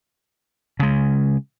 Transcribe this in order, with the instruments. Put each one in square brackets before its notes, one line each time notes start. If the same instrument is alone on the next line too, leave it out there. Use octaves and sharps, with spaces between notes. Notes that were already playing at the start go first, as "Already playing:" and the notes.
[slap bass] C#3 G#3